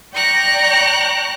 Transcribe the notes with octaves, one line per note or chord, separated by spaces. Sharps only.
D5 G5 A#5 C#6 F#6 A#6